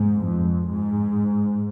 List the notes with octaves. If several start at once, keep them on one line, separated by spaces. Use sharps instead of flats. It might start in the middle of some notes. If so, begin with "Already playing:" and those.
Already playing: G#2
F2
G#2